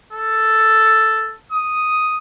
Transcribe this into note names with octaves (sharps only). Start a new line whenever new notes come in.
A4
D#6